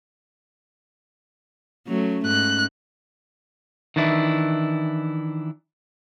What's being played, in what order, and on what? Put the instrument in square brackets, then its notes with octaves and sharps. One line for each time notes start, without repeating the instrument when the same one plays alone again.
[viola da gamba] F#3 A3 [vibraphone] C#4
[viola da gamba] G#2 [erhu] F#6
[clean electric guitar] D#3 E3 D4 E4